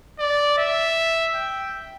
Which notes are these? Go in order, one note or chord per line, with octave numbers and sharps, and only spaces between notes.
D5
E5
G5